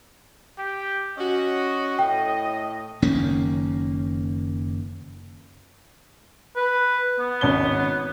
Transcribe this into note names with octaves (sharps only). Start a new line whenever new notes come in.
G4
C#4 F#4 D#5
A2 G5
F#1 D#3 A#3 C#4
B4
B3
G#1 C#4 G7